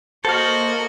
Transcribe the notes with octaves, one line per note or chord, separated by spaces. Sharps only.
A#3 F#4 A4 C5 D#5 F6